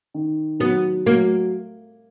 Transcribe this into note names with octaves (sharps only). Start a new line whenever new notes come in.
D#3
F#3 B3
F#3 A#3